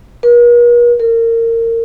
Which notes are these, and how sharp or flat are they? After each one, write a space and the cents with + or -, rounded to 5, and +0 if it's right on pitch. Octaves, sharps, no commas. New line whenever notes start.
A#4 +45
A#4 -25